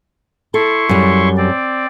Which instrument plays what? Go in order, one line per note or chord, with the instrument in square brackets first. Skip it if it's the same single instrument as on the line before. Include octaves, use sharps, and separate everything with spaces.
[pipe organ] E4 C6 C#6 [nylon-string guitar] A4
[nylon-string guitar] F#2 G3
[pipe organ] C4 D5